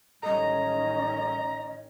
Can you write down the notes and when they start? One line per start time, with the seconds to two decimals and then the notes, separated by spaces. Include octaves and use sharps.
0.23 A1 D#3 G3 C#4 A4 D#5 A#5